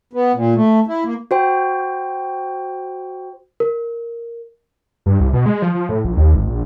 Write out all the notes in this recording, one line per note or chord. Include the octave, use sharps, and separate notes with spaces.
B3
A#2
A3
E4
A#3
F#4 C5 G5
A#4
G2
C2
B2
G#3
F3
F3
A2
A#1
D#2
G#1
A#1